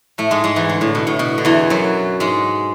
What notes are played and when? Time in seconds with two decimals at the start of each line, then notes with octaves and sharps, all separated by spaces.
0.18 A2 A3
0.31 G#2 G#3
0.44 G#2 G#3
0.56 E2 E3
0.69 D3
0.81 A2
0.95 B2
1.07 A2
1.19 B2
1.38 D3
1.45 E2 E3
1.70 F#2 F#3
2.20 G#2 G#3